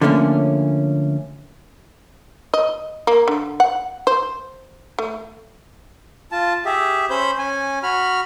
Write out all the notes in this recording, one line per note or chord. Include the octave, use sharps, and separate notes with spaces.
D3 F3 A3 A#3 C4 C#4
D#5
A#3
D3
F#5
C5
A3
F4 A5
G4 G#4 E5
C#4 C5 B5 G6
C#4 G#5
F#4 B5 F6